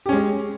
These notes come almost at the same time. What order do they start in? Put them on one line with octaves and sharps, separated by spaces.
G4 C#4 G#3